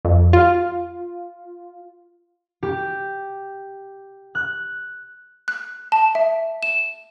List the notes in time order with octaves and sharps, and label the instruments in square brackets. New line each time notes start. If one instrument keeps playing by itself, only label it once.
[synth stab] F2
F4
[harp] G4
F#6
[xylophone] F#6
A5
E5
E7